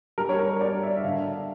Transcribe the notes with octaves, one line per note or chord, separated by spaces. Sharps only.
G3 A#4
C#5
A#4
G3 D5
E5
E5
D3 F5